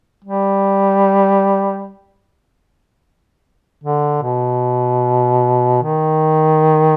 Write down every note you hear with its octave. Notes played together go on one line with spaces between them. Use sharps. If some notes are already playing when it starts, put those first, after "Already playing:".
G3
D3
B2
D#3